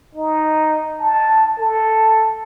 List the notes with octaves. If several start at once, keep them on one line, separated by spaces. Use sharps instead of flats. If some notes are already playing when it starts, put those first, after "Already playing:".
D#4
A5
A4